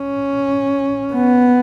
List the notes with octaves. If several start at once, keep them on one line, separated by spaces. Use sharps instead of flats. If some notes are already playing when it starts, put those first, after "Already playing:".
Already playing: C#4
B3